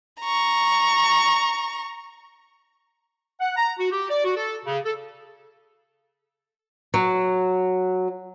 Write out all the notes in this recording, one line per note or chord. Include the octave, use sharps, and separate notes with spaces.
A#5 C#6
F#5
A#5
F#4
G4
D5
F#4
A4
C#3
A4
F#3